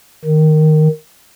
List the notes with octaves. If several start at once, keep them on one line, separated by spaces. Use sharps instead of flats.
D#3